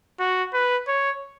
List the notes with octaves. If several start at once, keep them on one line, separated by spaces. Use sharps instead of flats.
F#4
B4
C#5